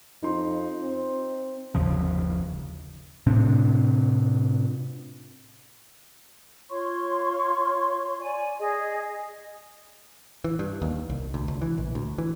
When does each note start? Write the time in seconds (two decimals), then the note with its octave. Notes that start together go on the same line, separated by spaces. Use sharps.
0.23 F2 D#4 C6
0.83 C4
1.75 G1 D#2 C#3 F3
3.26 A2 C3 C4 D4
6.70 F4 C#5 C6 C#6
8.20 D5 G#5
8.59 G#4 D#5
10.44 E3
10.59 G2
10.82 D#2
11.10 C2
11.34 D2
11.48 C#2
11.62 E3
11.78 A#1
11.95 D2
12.18 E3